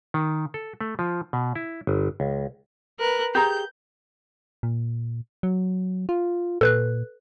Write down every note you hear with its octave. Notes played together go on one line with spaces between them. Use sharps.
D#3
A4
A3
F3
B2
E4
G1
C#2
A#4 B4 F#6
G4 G#4 A#5 G6
A#2
F#3
F4
A#2 A4 B4 F#6